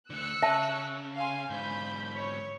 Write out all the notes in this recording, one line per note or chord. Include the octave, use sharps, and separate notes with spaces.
D2 D3 E6 F#6 C#7
C#3 E5 A5
F5 G#5 C6
G#2 D3 B5 G6
C#5